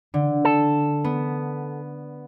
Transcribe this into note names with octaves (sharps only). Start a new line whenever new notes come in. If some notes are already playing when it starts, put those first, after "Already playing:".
D3
A4
B3